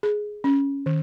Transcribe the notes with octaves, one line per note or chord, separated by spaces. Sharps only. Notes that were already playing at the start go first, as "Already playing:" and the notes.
G#4
C#4
D#3